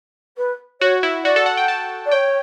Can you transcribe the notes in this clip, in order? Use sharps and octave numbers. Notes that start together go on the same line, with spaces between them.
B4
F#4 C#5
E4
F#4 D5
A4
F#5
G5
A5
D5
C#5 G5